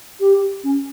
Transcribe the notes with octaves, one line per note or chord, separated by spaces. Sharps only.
G4
C#4